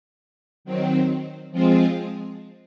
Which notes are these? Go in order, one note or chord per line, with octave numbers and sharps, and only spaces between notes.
D#3 F#3 C4
F3 G#3 C4 F4 G#4